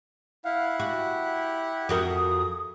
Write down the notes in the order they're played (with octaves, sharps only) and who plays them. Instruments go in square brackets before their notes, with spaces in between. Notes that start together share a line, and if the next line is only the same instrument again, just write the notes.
[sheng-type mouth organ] E4 F#5 [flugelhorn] F5
[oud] F#4 [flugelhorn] G4
[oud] F2 F#4 A#4 [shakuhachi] D#6